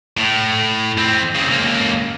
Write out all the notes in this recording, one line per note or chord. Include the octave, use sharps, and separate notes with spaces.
A2
F2 C4
C#3 C4
C#2 A#3